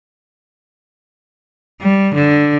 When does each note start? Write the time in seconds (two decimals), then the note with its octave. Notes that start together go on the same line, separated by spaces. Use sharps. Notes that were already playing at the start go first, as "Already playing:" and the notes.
1.81 G3
2.14 D3